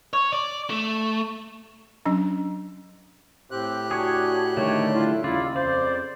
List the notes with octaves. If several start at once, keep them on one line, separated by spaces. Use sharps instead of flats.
C#5
D5
A3
F#3 C#4 D4
A2 C4 G4 F#6
D4 F#4 G#4 C#5
D3 D#3 G3 A3 C#5
E4 F4
D#2 C#3 E4 F4 D5
F2 C5 D5